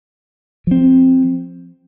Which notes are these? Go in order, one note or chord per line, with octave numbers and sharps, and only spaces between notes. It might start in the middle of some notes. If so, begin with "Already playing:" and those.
F3 C4